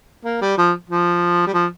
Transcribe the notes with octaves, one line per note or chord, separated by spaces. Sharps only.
A#3
G3
F3
F3
G3
F3